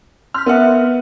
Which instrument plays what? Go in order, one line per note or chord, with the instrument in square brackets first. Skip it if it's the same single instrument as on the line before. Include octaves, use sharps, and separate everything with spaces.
[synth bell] C6 G6 B6 [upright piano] F6
[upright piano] B3 F#5 [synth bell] A#4 B4 E5